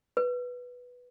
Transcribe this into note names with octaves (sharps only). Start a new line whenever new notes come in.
B4